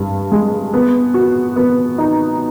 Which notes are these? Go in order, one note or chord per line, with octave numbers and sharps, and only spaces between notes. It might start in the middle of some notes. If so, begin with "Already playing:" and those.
Already playing: G2
G#3
B3
F#4
B3
D#4